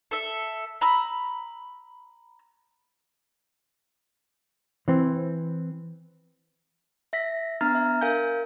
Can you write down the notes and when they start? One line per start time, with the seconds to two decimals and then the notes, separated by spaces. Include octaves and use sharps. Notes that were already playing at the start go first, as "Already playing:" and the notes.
0.11 A4 E5
0.81 A#5 B5 E6
4.88 E3 C4
7.13 E5 A#6 B6
7.61 B3 D4 A#5 F6 A6
7.75 E5
8.01 A#4 F5 G#5 G6